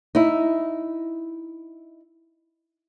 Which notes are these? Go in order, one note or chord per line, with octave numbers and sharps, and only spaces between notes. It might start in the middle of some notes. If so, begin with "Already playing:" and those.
D#4 E4